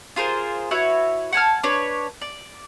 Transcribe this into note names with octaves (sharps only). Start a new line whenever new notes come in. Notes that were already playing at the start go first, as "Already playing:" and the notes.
F4 G#4 A#4 C5
E4 F#4 B4 C#5
F#5 G#5 A5 F6
D4 B4 C#5
D5